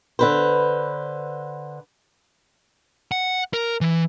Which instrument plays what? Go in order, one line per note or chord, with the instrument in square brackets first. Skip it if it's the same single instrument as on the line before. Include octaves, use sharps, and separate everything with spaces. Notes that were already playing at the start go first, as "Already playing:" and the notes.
[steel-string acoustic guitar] D3 B4 C5
[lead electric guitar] F#5
A#4
E3